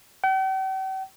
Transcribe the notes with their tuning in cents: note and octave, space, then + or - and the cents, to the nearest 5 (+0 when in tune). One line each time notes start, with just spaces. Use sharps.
G5 -45